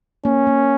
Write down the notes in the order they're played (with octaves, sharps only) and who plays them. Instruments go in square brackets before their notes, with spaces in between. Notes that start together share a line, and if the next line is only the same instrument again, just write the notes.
[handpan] A#3 [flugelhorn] C#4
[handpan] A#3